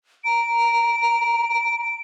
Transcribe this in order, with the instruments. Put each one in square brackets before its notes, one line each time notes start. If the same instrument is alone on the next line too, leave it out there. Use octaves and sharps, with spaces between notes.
[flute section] A#5 [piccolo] D7